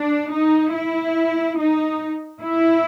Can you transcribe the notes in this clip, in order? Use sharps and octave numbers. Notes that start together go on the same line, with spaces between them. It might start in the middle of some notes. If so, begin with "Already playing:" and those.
Already playing: D4
D#4
E4
D#4
E4